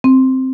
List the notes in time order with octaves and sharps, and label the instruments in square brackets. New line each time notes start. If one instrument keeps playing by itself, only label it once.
[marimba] C4